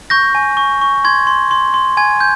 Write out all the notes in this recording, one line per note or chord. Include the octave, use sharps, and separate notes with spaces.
C#6 G6 A#6
G#5
C#6
C#6
C6 G#6
C6
C6
C6
G#5 G#6
G6